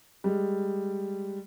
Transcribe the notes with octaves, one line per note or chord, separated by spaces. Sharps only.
G3 G#3